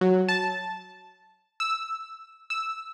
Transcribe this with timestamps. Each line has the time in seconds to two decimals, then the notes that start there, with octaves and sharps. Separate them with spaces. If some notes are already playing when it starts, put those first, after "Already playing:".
0.01 F#3
0.28 A5
1.60 E6
2.50 E6